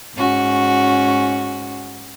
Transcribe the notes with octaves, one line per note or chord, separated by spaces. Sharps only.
G#2 C#4 F#4